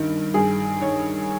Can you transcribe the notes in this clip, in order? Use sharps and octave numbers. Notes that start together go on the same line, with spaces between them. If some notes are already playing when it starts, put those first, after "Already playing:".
Already playing: G2 D#3
G2 G#4
D#3 C#5